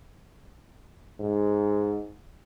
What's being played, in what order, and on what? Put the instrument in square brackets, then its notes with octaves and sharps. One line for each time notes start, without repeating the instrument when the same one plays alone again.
[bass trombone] G#2